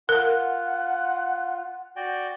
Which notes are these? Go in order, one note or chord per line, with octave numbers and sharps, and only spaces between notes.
F4 A#4 F#5
F#4 D5 G5